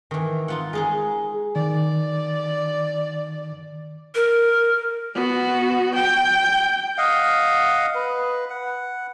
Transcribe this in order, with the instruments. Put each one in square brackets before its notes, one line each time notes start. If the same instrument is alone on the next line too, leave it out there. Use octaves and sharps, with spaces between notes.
[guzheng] D#3 E3
D#4 F4 F#5
G#3 D#4 G#4
[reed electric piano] D#3 [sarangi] D5
[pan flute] A#4
[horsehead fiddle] B3 F#4
G5
[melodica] D#5 F5 F#5
B4
F#5